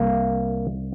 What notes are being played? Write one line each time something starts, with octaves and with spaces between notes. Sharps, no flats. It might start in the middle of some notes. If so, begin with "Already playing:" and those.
Already playing: C2 A#3